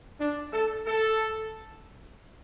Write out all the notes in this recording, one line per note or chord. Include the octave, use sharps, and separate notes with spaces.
D4
A4
A4